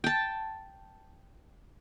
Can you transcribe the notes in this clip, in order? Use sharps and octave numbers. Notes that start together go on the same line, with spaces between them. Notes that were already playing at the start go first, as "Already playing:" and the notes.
G5 A5